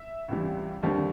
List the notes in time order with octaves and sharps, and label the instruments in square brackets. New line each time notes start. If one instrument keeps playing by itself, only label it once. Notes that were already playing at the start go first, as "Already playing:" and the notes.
Already playing: [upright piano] E5
C#2 C3 E3 G3
D#2 D3 G3 C4